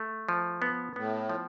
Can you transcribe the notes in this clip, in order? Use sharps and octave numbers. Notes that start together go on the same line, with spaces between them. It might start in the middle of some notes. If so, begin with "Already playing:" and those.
Already playing: A3
F3
B3
A2 B3
F3